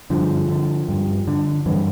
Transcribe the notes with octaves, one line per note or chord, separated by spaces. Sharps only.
G2 D3 F3
D3
G2
D3
G2 E3